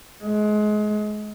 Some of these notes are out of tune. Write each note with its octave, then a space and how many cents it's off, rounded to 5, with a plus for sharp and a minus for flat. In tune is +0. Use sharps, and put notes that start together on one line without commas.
G#3 +25